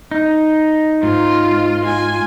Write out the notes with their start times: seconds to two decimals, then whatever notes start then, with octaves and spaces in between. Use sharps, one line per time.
0.11 D#4
1.03 G#2 F4
1.83 F4 G#5